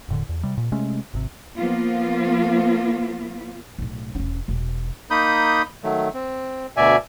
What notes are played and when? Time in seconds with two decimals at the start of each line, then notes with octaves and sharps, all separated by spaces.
0.09 E1 A2 D3
0.29 E2
0.43 C3 G3
0.57 A#2
0.72 C3 G#3 A3 C#4
1.14 G#1 C3
1.56 F3 A#3 B3 F4
3.78 B1 A2
4.15 E1 C#4
4.48 E1 B2
5.11 A#3 D#4 B5 D#6 G6
5.84 D#3 F#3 A3
6.14 C4
6.77 D2 B2 D5 E5 G#5